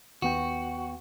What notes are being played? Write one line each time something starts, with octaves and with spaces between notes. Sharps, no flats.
D#2 B3 F#4 G5